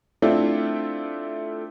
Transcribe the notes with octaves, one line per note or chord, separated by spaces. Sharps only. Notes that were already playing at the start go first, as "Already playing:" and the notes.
A3 C4 D4 E4 F4